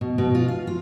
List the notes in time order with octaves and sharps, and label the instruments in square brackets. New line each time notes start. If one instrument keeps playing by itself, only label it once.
[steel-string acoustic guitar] B2
B2
F4
F5
F4